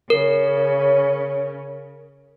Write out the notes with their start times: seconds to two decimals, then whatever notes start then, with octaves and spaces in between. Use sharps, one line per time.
0.10 C#3 C#4 A#4